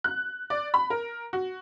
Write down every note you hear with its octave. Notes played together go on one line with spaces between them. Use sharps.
F#6
D5
B5
A#4
F#4